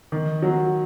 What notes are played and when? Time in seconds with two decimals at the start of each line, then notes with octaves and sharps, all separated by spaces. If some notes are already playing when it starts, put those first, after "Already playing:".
0.12 D#3
0.42 F#3